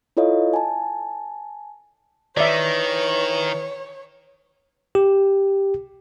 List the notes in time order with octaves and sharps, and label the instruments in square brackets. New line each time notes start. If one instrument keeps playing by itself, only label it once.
[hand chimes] E4 F4 A4 C#5 D#5 F5
G#5 A5
[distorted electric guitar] D#3 [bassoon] E3 [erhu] C#5 [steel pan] D5 E5
[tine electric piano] G4